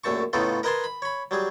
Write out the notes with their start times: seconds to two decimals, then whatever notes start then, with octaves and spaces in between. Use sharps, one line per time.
0.04 A#1 F#2 A3 A5 C#6
0.33 A2 C#3 B3 D#4 F4 A4
0.63 A#4 B4 D#5 G#5 A5 C6
0.84 B5
1.02 C#5 B5
1.31 F#3 G3 G#4